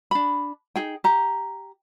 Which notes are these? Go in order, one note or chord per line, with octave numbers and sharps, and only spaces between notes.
D4 B5
D#4 G#4 G5
G4 A#5